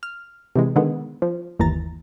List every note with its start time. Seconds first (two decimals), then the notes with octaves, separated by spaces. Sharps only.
0.03 F6
0.56 C3 E3 G#3
0.76 D3 D#3 G#3 B3
1.22 F3
1.60 G1 D#2 E3 A#5 A6